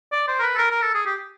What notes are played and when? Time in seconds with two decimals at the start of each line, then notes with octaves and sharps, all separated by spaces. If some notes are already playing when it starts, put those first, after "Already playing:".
0.12 D5
0.28 C5
0.39 A#4
0.43 B4
0.55 A4
0.58 A#4
0.71 A#4
0.82 A4
0.94 G#4
1.06 G4